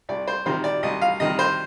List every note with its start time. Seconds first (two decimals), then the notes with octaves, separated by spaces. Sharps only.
0.09 C2 D5
0.28 C5
0.46 C3 D#3 G3 C5
0.64 D5
0.83 C2 D#5
1.02 F5
1.20 C3 D#3 G3 D#5
1.39 C5